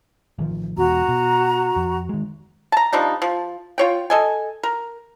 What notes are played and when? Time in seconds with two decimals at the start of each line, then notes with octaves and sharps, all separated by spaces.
0.39 A1 D#3 F3
0.77 E1 A#1 E2 F#4 A#5
1.09 B2
1.76 F2
2.09 D#3 G#3
2.72 A5 A#5
2.93 F3 G3 D4 D#4
3.22 F3
3.78 F4 C#5 G5
4.10 A4 D#5 G#5
4.63 A#4